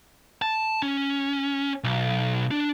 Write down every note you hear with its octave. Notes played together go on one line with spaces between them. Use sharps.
A5
C#4
B1
D4